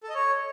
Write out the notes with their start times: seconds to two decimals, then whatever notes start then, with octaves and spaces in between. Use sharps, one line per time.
0.03 A4
0.09 D#5
0.15 C#5